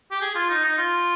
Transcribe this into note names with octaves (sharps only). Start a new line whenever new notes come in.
G4
G#4
F4
D#4
D#4
F4